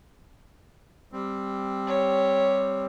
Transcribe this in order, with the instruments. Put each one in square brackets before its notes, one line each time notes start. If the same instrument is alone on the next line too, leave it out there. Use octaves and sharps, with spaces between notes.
[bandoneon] G3 C4
[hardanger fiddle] G4 C#5